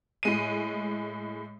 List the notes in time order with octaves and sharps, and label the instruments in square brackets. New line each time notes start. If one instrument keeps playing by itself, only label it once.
[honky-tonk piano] A2 G#3 D#7